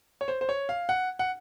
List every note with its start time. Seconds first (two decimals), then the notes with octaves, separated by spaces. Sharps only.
0.21 C#5
0.28 C5
0.41 C5
0.49 C#5
0.69 F5
0.89 F#5
1.19 F#5